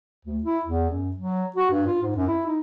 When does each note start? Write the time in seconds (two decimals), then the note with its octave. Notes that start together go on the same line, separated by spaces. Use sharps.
0.25 D2
0.43 E4
0.65 E2
0.89 F#2
1.16 F#3
1.56 F#4
1.71 G2
1.87 F4
2.02 G#2
2.16 F#2
2.28 E4
2.46 D#4